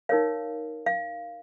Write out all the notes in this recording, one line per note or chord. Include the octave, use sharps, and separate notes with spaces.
D#4 A#4 C#5 F5
F5